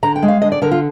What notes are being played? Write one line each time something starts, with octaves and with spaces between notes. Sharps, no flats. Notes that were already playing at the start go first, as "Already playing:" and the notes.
D3 A#5
G5
G#3
F5
D3 D#5
D5
D3 A#4
F4